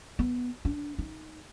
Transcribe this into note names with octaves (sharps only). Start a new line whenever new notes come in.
B3
D4
D#4